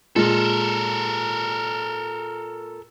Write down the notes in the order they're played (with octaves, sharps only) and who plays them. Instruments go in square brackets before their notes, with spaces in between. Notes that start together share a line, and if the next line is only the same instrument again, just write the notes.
[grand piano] A#2 G#3 [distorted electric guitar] A4 A#4